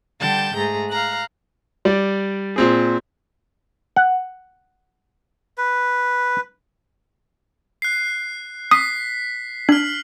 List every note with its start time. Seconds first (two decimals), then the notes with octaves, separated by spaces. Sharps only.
0.20 D3 G3 G5 A5 G6
0.55 G#2 A3 G#4 A#5
0.89 F5 A#5 F#6
1.85 G3 D5
2.56 A#2 C4 G#4
3.96 F#5
5.58 B4
7.82 F#6 C7
8.71 D#6 B6 C7
9.69 D4 F6 F#7